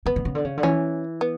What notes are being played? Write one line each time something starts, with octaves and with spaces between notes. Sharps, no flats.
C#3 B3
D3
C#3
D3
C#3
D3
E3 C#4
B3